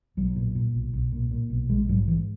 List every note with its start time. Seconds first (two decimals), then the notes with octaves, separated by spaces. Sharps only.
0.17 B1 F#3
0.36 A#2
0.55 A#2
0.75 B1
0.93 B1
1.12 A#2
1.31 A#2
1.50 B1
1.69 A#1 G#3
1.89 G#2 F#3
2.08 G#2 E3